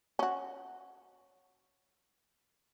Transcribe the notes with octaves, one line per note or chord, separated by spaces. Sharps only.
C#4 F#4